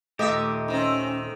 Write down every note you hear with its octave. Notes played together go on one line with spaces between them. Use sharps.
D#2 A#2 A3 G4 D#5 E5
D#3 C4 C#4